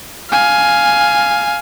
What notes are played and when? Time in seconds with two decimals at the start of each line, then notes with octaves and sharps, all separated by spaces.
0.31 F5 G#5